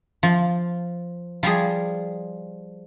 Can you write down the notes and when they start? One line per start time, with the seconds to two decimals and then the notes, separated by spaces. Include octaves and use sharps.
0.23 F3
1.43 F3 G3 G#4